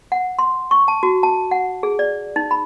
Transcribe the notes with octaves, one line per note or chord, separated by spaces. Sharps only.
F#5
C6
C#6
A5
F#4
A5
F#5
G#4
D5
D#4
B5